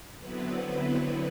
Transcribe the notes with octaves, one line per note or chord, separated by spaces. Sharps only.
D3 F#3 B3 C4 E4 B4